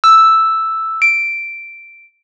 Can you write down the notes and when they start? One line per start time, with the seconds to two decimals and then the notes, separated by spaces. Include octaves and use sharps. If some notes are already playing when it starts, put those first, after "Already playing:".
0.04 E6
1.02 D7